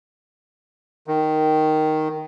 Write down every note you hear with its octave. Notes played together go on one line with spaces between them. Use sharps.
D#3